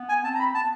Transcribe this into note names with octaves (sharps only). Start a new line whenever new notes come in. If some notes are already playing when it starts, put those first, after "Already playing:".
Already playing: B3
G#5
C4 A5
A#5
B5
B3 A5